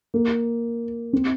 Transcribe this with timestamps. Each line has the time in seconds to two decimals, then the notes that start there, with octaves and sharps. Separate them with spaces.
0.14 A#3
1.13 C4